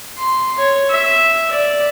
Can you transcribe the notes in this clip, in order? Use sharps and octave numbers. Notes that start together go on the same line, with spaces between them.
C6
C#5
E5
D5